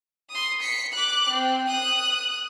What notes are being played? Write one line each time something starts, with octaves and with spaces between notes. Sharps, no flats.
C6 D#6
B6 C#7
D6 F#6
C4
D#6 F#6